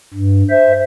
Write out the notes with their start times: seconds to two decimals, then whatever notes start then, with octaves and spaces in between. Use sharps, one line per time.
0.14 G2
0.50 C5 E5